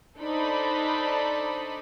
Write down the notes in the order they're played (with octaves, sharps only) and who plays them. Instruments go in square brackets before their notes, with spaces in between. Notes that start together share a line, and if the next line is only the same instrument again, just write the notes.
[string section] D4 D#4 A4 C5 D5 B5